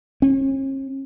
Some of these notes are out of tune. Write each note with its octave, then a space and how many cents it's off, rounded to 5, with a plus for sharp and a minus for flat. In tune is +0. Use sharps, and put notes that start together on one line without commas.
C#4 -45